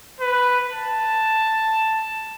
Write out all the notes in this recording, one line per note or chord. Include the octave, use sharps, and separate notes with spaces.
B4
A5